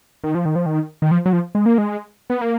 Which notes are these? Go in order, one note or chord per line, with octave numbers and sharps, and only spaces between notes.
D#3
F3
D#3
F3
D#3
D#3
F3
F#3
F3
G#3
A#3
G#3
B3
A#3